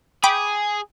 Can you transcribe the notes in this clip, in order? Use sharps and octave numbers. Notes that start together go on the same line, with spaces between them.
G#4 G5 B5 D6